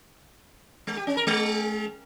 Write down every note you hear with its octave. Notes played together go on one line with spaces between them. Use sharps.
G#3
G4
C#4
A#4
G#3